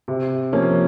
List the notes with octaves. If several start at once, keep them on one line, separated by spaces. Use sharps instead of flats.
C3
F3 A#3 C#4